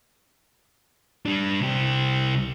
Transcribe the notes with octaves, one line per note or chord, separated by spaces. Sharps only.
G3 D4
C2 G4